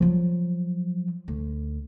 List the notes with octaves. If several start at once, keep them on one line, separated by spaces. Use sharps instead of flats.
F3 F#3
D2